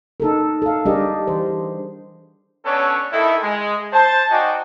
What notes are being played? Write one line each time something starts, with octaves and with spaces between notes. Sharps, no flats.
D#4 A4 A#4
A4 F5
G3 D4 G4 G#4 A#4 D#5
E3 C5
B3 C#4 D4 A4 C#5
D#3 E4 A4
G#3
C5 A5
D#4 F#4 D5 D#5 G5 G#5